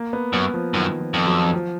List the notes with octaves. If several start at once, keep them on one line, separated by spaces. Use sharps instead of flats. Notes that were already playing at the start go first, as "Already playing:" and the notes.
Already playing: A#3
B3
F#2 B3
F3
F#2 D#3
F3
F2
F#3
F3